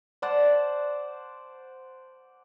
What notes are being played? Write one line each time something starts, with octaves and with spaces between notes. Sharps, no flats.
C5 D5 F#5 A5